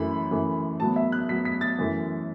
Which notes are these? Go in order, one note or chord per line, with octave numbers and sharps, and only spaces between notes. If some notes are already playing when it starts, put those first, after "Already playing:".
Already playing: F#2 E3 A3 B5
F#2 E3 A3
A2 F#3 B3 A5
E5
F#6
A2 F#3 B3 B6
B6
A6
F#2 E3 A3